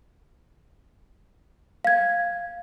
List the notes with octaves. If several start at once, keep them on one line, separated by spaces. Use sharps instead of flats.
F5 G#6